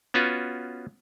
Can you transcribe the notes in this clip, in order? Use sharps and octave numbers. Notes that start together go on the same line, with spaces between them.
B3 C#4 F4 F#4 B4